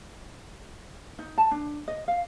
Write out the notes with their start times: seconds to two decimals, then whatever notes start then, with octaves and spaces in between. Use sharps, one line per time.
1.19 D#4
1.38 A5
1.51 D4
1.88 D#5
2.08 F5